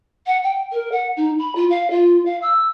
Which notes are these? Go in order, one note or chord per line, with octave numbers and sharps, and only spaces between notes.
F#5
G5
A#4
F#5
D#4
B5
F4
F5
F4
F5
E6